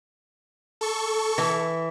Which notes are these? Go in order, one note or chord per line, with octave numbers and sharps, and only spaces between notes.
A4 C#6
E3